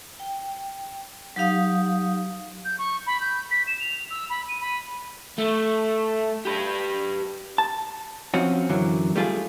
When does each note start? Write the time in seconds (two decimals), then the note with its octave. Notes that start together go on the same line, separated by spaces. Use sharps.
0.20 G5
1.36 F#3 D#4 G4 F5 D#6
2.65 G6
2.78 C#6
3.07 B5
3.20 G6
3.51 B6
3.67 E7
3.80 F7
4.10 E6
4.30 B5
4.48 D#7
4.61 B5
5.38 A3
6.45 G4 B4
7.58 A5
8.34 F3 C4 C#4 F#4
8.70 F#2 D3 E3 F#3
9.16 G3 A3 F4 F#4 G#4